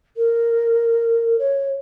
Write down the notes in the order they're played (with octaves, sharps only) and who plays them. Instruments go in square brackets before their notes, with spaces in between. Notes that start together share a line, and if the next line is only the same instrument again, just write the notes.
[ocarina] A#4
C#5